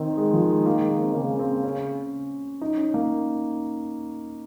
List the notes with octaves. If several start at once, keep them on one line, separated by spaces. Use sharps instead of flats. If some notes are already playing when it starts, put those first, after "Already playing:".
Already playing: D#3 C4
G#3
F3
G#3
A#3
G#3
A#3
C4
C#3 A#3
C4
C#4
D#4
C#4
A#3